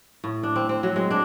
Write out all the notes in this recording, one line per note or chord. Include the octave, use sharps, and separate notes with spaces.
A2
D4
C4
C4
F#3
G#3
D4